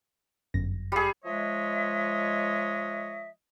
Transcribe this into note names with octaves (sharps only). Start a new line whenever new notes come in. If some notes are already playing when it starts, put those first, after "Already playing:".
G1 F#2 A#6
G3 G#4
F3 G#3 C#5 D#5 E5